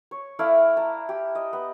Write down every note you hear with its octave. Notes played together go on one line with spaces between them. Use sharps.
C#5
A3 E4 D5 F5
A5 A#5
G4
D#5
B3